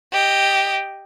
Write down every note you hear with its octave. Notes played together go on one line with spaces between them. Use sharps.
G4 D#5